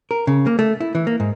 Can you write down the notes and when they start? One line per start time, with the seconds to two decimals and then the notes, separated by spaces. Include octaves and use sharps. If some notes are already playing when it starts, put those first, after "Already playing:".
0.11 A#4
0.27 C#3
0.47 A#3
0.59 A3
0.80 E4
0.95 E3
1.07 A#3
1.20 G#2